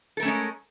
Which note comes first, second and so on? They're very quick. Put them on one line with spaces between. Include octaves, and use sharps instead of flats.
A4 A#4 A3 C#4 G#3